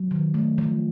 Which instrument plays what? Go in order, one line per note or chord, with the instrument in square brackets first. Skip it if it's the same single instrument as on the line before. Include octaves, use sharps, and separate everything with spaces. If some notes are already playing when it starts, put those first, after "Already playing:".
Already playing: [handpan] F#3
D#3
A3
F3